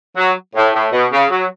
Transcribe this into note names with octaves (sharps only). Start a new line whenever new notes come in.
F#3
A2
A2
B2
C#3
F#3